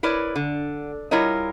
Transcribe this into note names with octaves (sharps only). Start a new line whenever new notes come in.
E4 A#4 B4 C#5 D5
D3
G3 E4 F4 A#4 C#5 D#5